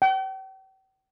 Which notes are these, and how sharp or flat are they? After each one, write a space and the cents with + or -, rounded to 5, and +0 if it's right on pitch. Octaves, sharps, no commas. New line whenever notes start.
G5 -40